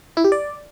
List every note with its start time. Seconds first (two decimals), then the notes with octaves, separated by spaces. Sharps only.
0.17 E4
0.24 G4
0.32 D5